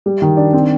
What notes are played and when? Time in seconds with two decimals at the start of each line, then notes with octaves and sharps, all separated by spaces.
0.06 G3
0.22 D#3
0.37 D4
0.53 C4